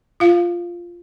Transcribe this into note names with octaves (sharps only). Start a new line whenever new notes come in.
F4 F5